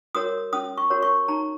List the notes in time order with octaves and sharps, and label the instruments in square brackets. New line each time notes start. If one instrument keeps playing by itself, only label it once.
[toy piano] F#4 A#4 C#5 D#6
C#4 D#6
C#6
F#4 A#4 C#5
C#6
D#4 A#5